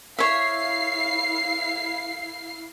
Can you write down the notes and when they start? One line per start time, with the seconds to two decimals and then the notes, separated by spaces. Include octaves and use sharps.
0.19 E4 C#5 E5 F5 C7